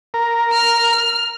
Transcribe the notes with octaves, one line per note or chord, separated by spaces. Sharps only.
A#4
F6